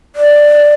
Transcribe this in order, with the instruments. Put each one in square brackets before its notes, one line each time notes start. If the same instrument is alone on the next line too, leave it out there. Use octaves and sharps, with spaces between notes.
[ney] D5